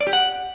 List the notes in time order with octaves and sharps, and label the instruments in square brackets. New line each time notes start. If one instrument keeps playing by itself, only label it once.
[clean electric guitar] D5
G4
F#5